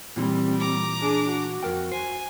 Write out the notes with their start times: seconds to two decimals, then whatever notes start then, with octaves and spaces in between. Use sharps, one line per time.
0.16 A#2 E3 G3 C4
0.60 A#5 D6
1.01 D4 G#4
1.29 F#4
1.63 F2 A#4 G5
1.92 C5 G#5